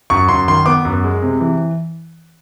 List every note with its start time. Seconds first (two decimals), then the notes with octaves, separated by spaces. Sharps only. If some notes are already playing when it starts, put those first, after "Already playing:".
0.10 F#2 C#6
0.29 F#2 C6
0.48 D#3 C6
0.66 B3 D6
0.85 F#2
1.04 G#3
1.22 C3
1.41 E3